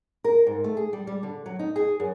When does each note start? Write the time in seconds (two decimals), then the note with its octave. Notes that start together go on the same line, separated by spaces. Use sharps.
0.24 A#4
0.47 G#2
0.64 A3
0.77 G#4
0.93 G3
1.07 G3
1.23 D3
1.46 F#3
1.59 D#4
1.76 G#4
2.00 F#2